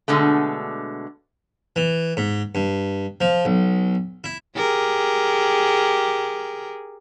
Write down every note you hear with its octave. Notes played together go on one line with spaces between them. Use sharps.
B2 D3 G#3 A3
E3
G#2
G2
F3
B1
E4
G4 G#4 A#4